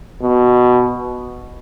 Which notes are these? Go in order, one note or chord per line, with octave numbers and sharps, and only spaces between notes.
B2